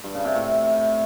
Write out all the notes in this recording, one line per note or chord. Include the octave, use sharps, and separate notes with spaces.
G2
C#3
C3
A2